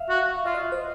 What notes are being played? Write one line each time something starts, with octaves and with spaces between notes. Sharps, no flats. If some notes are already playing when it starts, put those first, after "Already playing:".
Already playing: E5 F5
F#4
F4 E5
D#5
C5